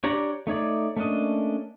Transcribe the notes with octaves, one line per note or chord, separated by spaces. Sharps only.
D4 G4 C#5 D5 A#5
A3 D#4 C#5 D5
A3 A#3 C#4 D4 D#5